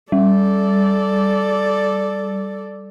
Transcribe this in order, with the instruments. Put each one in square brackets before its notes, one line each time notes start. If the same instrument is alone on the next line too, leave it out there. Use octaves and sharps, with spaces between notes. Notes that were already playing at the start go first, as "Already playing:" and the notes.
[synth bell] G3 [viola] A4 D5